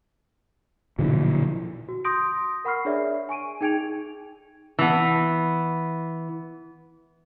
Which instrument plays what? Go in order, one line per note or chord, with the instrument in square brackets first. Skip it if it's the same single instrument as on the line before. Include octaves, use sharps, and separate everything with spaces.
[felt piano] B1 E4 [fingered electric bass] A#2 D3 F3
[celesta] F#4
C6 D#6 G6 A#6 D7
A#4 F#5 B5 C#6 F6 C7
D4 G#4 A#4 C#5 D5 E5
G#5 C#6 D7 D#7
D#4 G#4 G5 G#6 D7 F7
[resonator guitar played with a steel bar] E3 B3